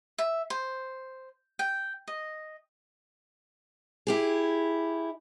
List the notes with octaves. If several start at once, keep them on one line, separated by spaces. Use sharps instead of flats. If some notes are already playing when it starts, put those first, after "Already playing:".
E5
C5
G5
D#5
E4 G4 G#4